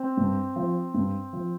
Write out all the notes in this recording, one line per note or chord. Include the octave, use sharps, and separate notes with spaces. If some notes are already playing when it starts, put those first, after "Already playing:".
Already playing: C4
G2
F3
G2
F3